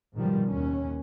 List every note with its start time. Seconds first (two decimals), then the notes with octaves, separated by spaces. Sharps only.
0.14 G#2 B2 D#3 F3 G3
0.48 D#2 C#4